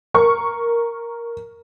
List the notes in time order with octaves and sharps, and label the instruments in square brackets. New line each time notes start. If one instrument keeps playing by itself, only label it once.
[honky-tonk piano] A#4 C#6